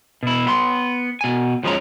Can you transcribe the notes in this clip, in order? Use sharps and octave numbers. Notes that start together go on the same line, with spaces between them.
B2 E4
B3 C6
B2 G#5
D#2 F3 G#3 C#4 A#5